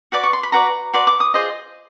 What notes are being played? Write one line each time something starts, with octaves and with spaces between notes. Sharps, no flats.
F#4 B4 D5 D6
C#6
C6
B5
F#4 B4 D5 A#5
F#4 B4 D5 C6
D6
D#6
F4 G#4 C5 D#5